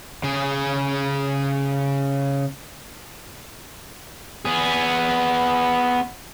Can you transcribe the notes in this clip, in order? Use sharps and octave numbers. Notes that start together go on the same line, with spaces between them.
C#3 G#4
B3 G#4